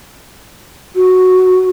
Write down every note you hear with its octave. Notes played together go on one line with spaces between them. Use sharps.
F#4